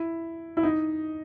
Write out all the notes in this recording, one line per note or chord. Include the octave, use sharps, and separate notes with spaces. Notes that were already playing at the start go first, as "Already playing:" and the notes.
Already playing: E4
E4
D#4